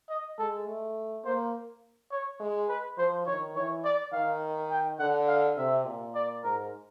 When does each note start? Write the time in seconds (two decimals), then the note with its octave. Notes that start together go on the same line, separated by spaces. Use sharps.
0.09 D#5
0.39 G#3 A4
0.67 A3
1.24 A#3 C5
2.11 C#5
2.40 G#3
2.69 B4
2.98 F3 C5
3.27 D#3 C#5
3.56 E3 C#5
3.85 D5
4.13 D#3 F5
4.71 G5
4.99 D3 F#5
5.28 F5
5.57 C3 E5
5.86 A#2
6.15 D5
6.44 G#2 A#4